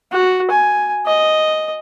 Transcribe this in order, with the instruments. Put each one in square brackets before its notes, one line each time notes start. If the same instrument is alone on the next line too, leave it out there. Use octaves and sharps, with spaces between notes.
[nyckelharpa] F#4
G#5
D#5